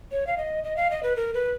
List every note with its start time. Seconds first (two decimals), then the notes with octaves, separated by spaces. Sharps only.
0.12 C#5
0.27 F5
0.38 D#5
0.64 D#5
0.77 F5
0.91 D#5
1.03 B4
1.16 A#4
1.34 B4